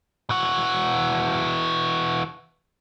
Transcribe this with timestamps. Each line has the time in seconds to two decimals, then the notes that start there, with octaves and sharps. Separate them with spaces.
0.30 E3 F#4